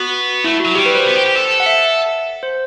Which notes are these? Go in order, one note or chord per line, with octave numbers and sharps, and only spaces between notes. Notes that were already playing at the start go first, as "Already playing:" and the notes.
Already playing: B3 F#4
A3 E4
F#4
F#3
G3 G4
B4
C5
B3
G4
G4
A4
F#5
E5
C5